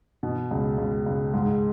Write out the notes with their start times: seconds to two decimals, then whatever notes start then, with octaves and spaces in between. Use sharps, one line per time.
0.23 B2
0.51 C#2
0.78 C#2
1.06 C#2
1.34 G#2